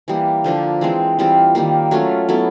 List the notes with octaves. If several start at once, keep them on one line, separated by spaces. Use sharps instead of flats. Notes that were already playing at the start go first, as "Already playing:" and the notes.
E3 G3 A#3
D3 F3 A#3 D4
E3 G#3 C4
E3 G3 C4 F4
D#3 G3 A#3
F#3 A3 C#4 F4
F#3 B3 E4 A4